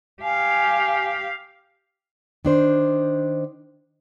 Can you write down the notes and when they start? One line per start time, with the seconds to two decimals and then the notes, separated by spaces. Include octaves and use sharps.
0.23 G4 F5 G#5
2.45 D#3 D4 C5